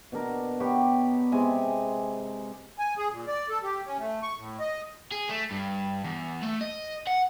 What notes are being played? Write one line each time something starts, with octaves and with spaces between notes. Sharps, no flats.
B2 D4 A#4
B3 G4 C#5
C3 G#3 G#5
G#5
G#4
A#2
D5
A4
G4
C#4
A3
C#6
A2
D#5
G#4
A3
G2
E2
A3
D#5
F#5